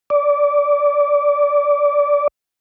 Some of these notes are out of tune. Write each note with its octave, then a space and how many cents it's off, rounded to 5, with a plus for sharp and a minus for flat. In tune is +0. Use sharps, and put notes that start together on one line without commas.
D5 -20